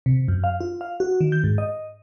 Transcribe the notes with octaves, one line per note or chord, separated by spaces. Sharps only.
C3
F#2
F5
F4
F5
F#4
D#3
G6
G#2
D#5